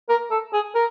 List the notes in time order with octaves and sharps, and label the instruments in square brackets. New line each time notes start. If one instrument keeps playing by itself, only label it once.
[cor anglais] A#4
A4
G#4
A#4